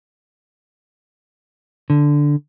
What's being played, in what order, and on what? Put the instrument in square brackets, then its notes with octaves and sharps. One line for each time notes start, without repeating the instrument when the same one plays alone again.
[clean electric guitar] D3